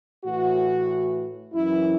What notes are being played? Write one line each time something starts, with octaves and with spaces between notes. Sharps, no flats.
A2 E3 F#4
F#2 E3 E4